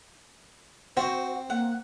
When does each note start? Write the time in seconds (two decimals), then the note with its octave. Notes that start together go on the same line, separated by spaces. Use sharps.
0.97 C4 F#4 C5
1.50 A#3 F#5